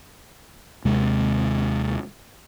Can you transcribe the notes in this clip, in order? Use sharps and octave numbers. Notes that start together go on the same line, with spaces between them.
D#2 C3 G#3